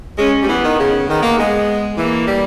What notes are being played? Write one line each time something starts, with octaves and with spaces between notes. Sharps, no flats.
G#3 C#4
G3
E3 B3
D#3
C#3
D#3 B3
A#3
G#3
E3 A#3
G3